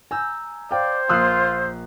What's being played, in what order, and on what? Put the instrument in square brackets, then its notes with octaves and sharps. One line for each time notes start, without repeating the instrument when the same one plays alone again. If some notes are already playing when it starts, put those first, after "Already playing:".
[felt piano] G#5 [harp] A#5 E6 G6
[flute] C5 [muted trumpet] D5 [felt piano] F5 G5
[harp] A#1 A#3 C7 [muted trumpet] F4 [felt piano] D#6 E6 F#6